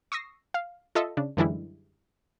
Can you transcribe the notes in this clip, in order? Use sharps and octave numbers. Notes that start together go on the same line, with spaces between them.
C#6 D#6 E6 A#6 C7
F5
F4 A4 D#5 E5
C#3 D4
F#2 D3 E3 G3 G#3 E4